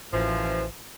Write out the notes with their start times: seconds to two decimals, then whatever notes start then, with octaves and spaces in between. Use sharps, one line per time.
0.13 A1 F#2 E3 F3